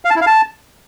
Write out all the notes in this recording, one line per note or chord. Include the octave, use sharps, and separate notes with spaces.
F5
A5
E4
F5
A5